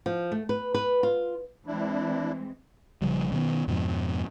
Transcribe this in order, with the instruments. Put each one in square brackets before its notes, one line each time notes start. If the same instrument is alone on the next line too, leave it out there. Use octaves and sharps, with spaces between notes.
[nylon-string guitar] F3
A3
B4
B4
F4
[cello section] E3 G#3 C4 [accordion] D4 E4
[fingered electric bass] A#1 C#3 F3 G3
B2 D#3 F3 B3
F2 G#2 B2 F3